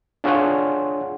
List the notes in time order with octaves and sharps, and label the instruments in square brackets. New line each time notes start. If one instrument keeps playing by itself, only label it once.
[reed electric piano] D4 F4 G#4 C#5 F#5 C6